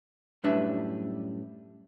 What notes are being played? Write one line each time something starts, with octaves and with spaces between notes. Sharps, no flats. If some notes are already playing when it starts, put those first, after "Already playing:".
F#2 A2 G3 D4 B4 E5